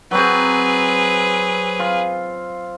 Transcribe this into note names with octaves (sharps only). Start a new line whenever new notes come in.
F#3 C4 G#4 B4
F4